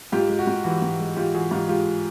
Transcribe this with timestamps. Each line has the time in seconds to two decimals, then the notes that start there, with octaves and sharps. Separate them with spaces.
0.12 G#2 F4 G4
0.29 G#3
0.39 F#4
0.47 G#2
0.64 E3 F#4
0.82 G#2
1.00 G#3
1.16 G#2 F4 G4
1.34 E3 F#4 G#4
1.51 G#2 F4 G4
1.68 G#3 F4 G4